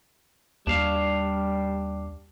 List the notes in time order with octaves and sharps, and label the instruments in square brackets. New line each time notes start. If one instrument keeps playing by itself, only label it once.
[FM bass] D#2 [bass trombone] G3 [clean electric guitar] D4 F5